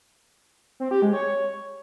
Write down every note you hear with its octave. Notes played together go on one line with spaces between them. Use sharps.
C4
G4
G#3
C#5